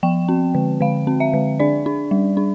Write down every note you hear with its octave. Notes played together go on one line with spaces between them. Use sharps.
F3 G5
C4
D3
D3 F5
C4
E5
D3
D4 D5
D4
G3
D4